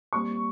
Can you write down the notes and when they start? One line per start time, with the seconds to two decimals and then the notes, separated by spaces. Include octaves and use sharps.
0.13 A#2 G3 C4 C#6